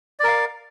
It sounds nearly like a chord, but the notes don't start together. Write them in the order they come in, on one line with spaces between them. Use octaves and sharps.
D5 A#4 F5